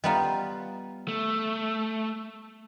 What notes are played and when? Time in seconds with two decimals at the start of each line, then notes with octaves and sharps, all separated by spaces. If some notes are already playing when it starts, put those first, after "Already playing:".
0.04 G3 B3 F4 D#5 A#5
1.08 A3